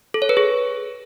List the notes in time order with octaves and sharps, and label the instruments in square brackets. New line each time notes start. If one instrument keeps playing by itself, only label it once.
[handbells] A4
C#5
B4
G#4